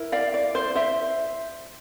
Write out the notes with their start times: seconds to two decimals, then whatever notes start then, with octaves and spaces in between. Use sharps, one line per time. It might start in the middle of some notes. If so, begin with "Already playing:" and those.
Already playing: E4 A#4
0.12 D5 F5
0.34 D5
0.55 C5
0.75 C5 E5